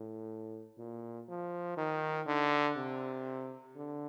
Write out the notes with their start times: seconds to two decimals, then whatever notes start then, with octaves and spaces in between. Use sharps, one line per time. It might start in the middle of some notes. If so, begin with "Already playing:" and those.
Already playing: A2
0.78 A#2
1.28 F3
1.77 D#3
2.27 D3
2.76 C3
3.75 D3